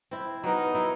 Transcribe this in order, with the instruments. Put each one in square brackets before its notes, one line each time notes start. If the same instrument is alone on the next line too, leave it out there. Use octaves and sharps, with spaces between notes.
[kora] C4 E4
[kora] F#3 B3 A#4 [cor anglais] D#4
[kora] F#3 E4